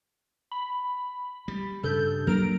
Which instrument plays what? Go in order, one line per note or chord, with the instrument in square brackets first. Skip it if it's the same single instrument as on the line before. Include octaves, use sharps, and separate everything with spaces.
[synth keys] B5
[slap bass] G3
[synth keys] G2 A4 G6 [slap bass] C#3
[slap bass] F#3 A#3 D4 [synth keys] A#4 A#5 D7